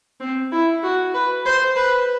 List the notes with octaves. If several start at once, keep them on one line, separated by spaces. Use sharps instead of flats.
C4
E4
F#4
B4
C5
B4